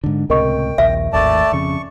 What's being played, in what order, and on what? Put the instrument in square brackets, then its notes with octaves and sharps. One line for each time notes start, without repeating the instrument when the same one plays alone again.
[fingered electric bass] G#2 D3
[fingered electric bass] C#2 A2 C3 [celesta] A#4 D#5 C#6 [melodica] G5
[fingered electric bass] A#1 D#2 [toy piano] E5
[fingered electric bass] G#1 D#2 A2 [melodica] A3 D5 A5
[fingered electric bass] F2 C#3 [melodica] C#6